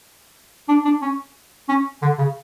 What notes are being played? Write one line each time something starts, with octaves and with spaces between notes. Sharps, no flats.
D4
D4
C#4
C#4
D3
C#3